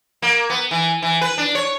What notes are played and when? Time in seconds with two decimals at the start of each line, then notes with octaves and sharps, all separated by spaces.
0.22 A#3
0.50 B3
0.71 E3
1.02 E3
1.21 B4
1.38 D4
1.55 C#5